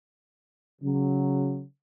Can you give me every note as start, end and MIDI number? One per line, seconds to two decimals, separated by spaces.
0.82 1.63 49
0.82 1.63 54